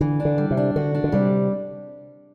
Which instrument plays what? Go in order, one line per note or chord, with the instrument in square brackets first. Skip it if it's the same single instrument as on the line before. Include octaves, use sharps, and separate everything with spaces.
[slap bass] D3 [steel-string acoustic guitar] E3
[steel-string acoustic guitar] D4
[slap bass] D3
[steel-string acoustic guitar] G3
[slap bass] C3
[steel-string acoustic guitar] D4
[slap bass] D3 [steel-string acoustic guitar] F#4
[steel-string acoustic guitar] D4
[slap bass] D3
[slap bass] C3 [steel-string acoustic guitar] G3